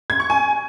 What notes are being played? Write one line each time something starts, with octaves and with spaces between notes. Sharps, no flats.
G#6
C#6
G#5